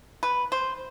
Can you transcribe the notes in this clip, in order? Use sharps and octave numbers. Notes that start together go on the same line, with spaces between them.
B4
C5